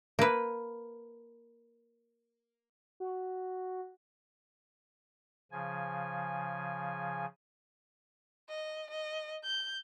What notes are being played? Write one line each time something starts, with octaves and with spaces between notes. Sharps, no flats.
A#3 B4
F#4
C#3 F3 G#5
D#5
D#5
G6